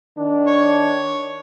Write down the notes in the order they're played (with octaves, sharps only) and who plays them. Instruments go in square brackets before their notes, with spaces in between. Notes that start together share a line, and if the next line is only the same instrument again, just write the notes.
[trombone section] D#3 D4
[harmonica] C#5